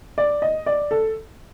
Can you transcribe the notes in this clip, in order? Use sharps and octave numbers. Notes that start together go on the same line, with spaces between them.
D5
D#5
D5
A4